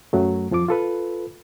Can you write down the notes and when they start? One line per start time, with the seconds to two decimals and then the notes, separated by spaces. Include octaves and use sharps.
0.13 F#2 F#3 A3
0.51 F2 F3 F4 D6
0.68 F4 A4 B4